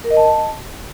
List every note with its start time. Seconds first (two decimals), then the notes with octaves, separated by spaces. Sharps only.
0.04 A#4
0.11 D#5
0.17 A5